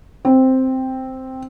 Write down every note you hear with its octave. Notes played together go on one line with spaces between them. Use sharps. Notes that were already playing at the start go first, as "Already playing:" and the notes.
C4